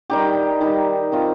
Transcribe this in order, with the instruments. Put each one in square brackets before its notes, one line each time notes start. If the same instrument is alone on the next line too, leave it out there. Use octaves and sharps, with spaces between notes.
[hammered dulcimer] D#3 G3 D#4 G4
D#3 G3 D#4 G4
D#3 C4 F4